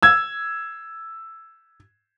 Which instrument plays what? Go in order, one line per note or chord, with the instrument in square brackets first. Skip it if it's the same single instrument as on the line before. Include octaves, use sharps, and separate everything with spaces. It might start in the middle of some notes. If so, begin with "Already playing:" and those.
[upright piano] E6 G#6